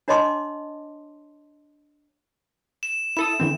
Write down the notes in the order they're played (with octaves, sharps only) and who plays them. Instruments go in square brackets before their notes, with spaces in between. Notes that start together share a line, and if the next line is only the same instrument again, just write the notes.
[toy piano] D4 C#5 D#5 A5 C6 D6
[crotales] E7
[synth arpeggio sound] E4 A4 D#6 [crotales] E7
[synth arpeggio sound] D3 E3 C4